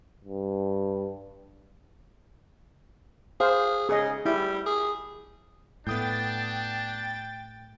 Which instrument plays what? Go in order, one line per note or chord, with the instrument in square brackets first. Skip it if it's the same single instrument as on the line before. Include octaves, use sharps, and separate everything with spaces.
[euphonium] G2
[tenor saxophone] G#4 [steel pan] C5 F5
[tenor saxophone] C#3 [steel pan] G#4 D#5
[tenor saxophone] G3 [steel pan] E4
[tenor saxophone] G#4
[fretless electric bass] A2 A3 [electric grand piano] B3 D#6 G6 [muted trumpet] D4 [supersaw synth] G5 A6